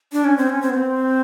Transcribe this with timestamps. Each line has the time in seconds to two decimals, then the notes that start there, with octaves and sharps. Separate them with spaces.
0.13 D4
0.25 C#4
0.38 C4
0.50 C#4
0.62 C4
0.70 B3
0.74 C4